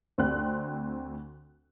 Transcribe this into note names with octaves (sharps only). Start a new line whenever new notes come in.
D2 C4 F#6